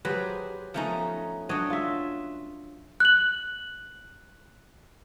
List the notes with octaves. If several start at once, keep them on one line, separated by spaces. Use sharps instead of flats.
F#3 G4 G#4 B4 C5
F3 A3 B3 C#4 D#4 A#5
F#3 D4 C#5 D#5
F4 E5
F#6 F#7